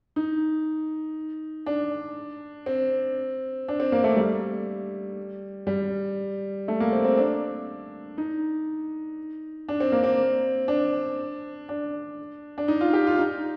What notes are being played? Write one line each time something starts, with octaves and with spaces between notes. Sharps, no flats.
D#4
D4
C4
D4
C4
A#3
A3
G3
G3
A3
A#3
C4
C4
D4
D#4
D4
C4
A#3
C4
D4
D4
D4
D#4
F4
G4
F4
D#4